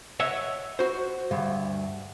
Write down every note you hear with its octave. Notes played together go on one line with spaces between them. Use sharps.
C#5 D#5 E5 F#5
F#4 C5
D2 G2